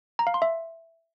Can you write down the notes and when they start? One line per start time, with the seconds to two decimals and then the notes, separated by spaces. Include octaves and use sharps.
0.19 A#5
0.27 F5
0.34 C6
0.42 E5